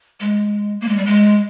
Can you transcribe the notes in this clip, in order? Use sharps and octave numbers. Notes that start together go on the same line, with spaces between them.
G#3
A#3
G#3
G3
G#3